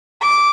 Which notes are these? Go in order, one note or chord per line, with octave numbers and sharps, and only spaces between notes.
D6